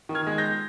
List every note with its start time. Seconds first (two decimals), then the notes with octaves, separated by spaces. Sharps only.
0.09 D#3
0.15 F6 G#6
0.27 G#3
0.38 G6 A#6